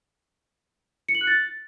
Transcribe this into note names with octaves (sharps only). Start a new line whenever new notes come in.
C#7
F#7
F#6
A6